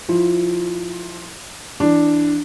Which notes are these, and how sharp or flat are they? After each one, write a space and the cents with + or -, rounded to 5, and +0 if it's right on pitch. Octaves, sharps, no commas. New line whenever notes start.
F3 +10 E4 +0
E3 +5 D4 +0